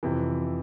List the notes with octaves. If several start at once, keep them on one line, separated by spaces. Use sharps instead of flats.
F2 C3 E3